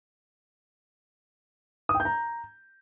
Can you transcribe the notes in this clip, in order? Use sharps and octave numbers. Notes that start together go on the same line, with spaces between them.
D#6
G5
G6
A#5